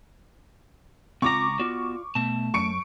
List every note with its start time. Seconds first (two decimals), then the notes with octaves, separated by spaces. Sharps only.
1.22 C#2 C4 F4 G5 A#5 C#6 D6
1.60 B3 F4 F#4 D5
2.15 B2 A3 A5
2.54 F#2 C#6 C#7 D7